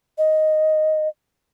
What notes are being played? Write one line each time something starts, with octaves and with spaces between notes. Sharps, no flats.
D#5